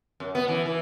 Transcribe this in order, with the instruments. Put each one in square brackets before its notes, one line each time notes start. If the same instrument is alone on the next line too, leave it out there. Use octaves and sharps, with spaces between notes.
[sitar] F#2
B3
E3
E3